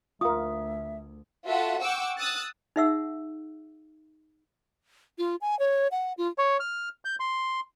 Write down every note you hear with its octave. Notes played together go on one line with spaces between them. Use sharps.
D2 F4 A#4 E5 D#6
F4 F#4 A4 E5 F#5
F#5 G5 C#6 D6 E6
D#6 E6 F#6 A6
D#4 G#4 E5 F#5 E6
F4
G#5
C#5
F#5
F4
C#5
F6
G6
C6